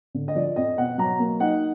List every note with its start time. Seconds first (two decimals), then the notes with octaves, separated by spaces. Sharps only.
0.14 D3
0.28 D#5
0.35 F3 D5
0.56 F2 D#5
0.77 B2 F#5
0.98 F#3 A#5
1.19 A#3
1.40 D#4 F#5